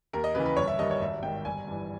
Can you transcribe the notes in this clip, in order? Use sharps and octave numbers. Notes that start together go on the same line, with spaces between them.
D#2 A#4
D#5
C#3 E3 B4
B4
G1 C#5
E5
G2 D#3 D#5
C#5
G#1 E5
G#2 D#3 G5
G1 G#5
G2 E3